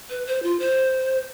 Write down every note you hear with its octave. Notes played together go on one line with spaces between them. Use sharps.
B4
C5
F4
C5